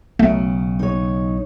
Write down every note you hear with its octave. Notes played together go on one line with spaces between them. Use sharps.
B1 C#3 A3
D#4 C#5